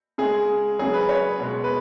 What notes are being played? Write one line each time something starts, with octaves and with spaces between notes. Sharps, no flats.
C#3 G#3 G#4
C#3 F#3 G#4
B4
C#5
B2 G#3
B4